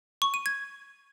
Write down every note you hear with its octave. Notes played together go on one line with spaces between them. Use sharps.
C#6
D#7
G#6